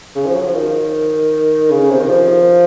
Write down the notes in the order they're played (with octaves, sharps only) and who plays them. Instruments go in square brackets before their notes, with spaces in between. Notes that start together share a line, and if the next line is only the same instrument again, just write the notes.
[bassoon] C#3
F3
F#3
F3
D#3
C#3
C3
D#3
F3